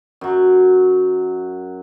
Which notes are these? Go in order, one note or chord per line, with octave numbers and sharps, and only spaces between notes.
F#2 F#3